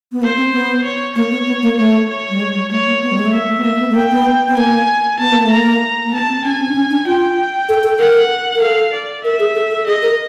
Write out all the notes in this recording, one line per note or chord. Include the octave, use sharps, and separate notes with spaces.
B3
A#3 C5
C4
B3
C#5
A#3 C#5
B3
B3
A#3
A3 C#5
C#5
G3
G#3
G3
A3 C#5
A#3
B3
G3
G#3
A3
A#3 E5
A3
B3
A#3 E5
A#3
B3
A3
A#3 G5
B3
B3
A#3 G#5
B3 A5
A#3
A3
A#5
A#3
A#3
B3 A5
C4
C#4 G#5
C4
D4
C#4
D4
F4 G5
A4
A4
A#4 F#5
A#4
A4 F5
D5
A#4 E5
G#4
A4
A4
G#4 D#5
A#4